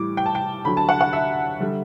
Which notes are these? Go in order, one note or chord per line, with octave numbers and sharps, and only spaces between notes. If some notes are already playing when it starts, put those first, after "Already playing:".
Already playing: A2 E3 G3 D6
G5
A5
G5
D2 D3 F#3 B5
A5
F#5
F#5
E5
D3 G3